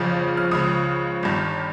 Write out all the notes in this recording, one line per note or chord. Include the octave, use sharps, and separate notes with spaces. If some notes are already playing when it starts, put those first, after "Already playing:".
Already playing: G1 F2 C#3 F3
F6
C#2 C#3 F3 D#6
G1 G2 D#3